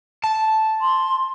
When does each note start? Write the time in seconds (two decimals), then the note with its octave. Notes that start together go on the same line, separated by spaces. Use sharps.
0.24 A5
0.81 C6